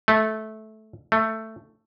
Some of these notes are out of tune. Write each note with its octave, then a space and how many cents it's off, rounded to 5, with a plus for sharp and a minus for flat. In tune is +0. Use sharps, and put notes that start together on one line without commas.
A3 -15
A3 +10